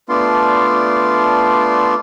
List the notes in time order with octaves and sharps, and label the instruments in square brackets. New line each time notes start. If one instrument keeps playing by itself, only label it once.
[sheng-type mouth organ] A3 B3 D4 F4 D5 C6